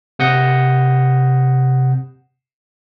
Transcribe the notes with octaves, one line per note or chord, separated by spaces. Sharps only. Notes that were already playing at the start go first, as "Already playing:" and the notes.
C3 F#5 D#6 G6 A#6 C#7